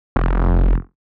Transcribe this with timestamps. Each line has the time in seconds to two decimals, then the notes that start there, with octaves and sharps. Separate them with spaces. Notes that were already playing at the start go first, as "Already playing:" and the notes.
0.16 F1